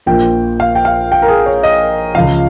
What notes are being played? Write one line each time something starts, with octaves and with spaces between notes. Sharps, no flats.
A#1 A#2 F3 G5
F5
G5
F5
G5
A#4
G#4
C#5
D#5
C#2 C#3 F3 F5